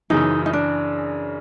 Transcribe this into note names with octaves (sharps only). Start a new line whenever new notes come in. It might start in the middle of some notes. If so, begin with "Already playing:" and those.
F#2 C#3 E3 D#4
D#4
D4